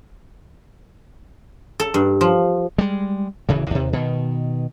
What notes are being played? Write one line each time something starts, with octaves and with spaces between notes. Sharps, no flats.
A4
G2
F3
G3 G#3
D1 C#3 E3
D#2 C3
B2 D#3